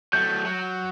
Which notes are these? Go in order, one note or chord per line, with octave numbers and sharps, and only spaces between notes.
F#3 A3 G6
F#3